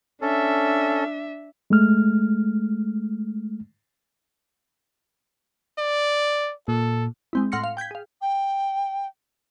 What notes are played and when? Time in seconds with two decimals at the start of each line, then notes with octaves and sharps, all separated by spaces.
0.21 C#4 D4 A4 E5
1.70 G#3 A3 F6
5.78 D5
6.68 A#2 A4
7.33 G#3 C4 E4
7.52 A2 F#5 C6 F6 A#6 C#7
7.64 F5
7.77 G5 G6 G#6 B6
7.91 G#4 F5
8.21 G5